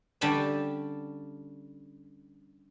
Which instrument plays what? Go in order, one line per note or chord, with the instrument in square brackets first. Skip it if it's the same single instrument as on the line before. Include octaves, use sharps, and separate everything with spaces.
[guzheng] D3 G3 C#4 D4 G5 A5